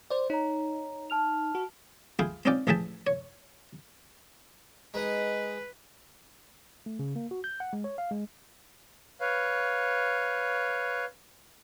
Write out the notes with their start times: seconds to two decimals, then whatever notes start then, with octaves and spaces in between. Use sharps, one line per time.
0.10 C5 D5
0.30 D#4 C#5 A#5
1.10 A5 F6 F7
1.55 F#4
2.19 E4 F4 G#4 G5 C6
2.45 C4 C#4 D#4 F4 D5 G5
2.67 A1 F3 G#4 E5 G5 A5
3.07 C#5
4.94 G#3 D#4 B4
6.86 A3
6.99 C#3
7.16 A#3
7.31 F#4
7.44 G6
7.60 F#5
7.73 G#3
7.84 C#5
7.98 F5
8.11 G#3
9.20 B4 C#5 F5